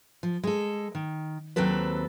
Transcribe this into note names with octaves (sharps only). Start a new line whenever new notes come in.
F3
G#3 A4
D#3
D#2 F#3 C4 A4 B4